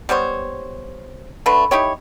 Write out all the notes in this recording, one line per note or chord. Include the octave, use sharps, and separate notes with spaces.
G3 B3 C5 C#5
D3 A3 B4
D#4 E4 G4 C#5